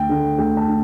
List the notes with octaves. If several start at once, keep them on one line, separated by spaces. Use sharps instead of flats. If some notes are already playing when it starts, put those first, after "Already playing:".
Already playing: D2 G5
D3 A3 D4
D2 G5
A5
D4